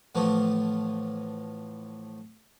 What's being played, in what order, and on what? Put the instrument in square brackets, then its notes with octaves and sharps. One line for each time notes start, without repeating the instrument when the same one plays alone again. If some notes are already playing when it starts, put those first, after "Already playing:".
[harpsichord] A2 E3 F3 A3 B3